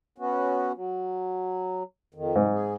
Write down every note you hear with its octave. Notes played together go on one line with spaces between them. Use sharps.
B3 C#4 F#4
F#3
F2 D#3
G#2 C3
G#4